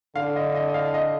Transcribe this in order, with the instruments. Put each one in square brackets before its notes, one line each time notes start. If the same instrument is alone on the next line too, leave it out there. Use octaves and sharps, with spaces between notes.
[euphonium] D3 [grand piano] F5
[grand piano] D#5
D#5
D#5
F5
D#5